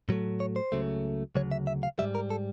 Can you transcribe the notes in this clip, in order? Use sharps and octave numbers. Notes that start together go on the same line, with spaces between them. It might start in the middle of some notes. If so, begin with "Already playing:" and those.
A2 F#3 A3
C#5
C5
C#2 C#3 F#3 A3
D2 C#3 F#3 C#5
E5
E5
F5
G#2 D#3 G3 E5
A#4
A4